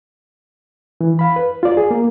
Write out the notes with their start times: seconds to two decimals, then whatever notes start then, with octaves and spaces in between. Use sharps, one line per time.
1.01 E3
1.19 F5 B5
1.36 B4
1.63 F4 D5
1.77 G#4
1.91 A#3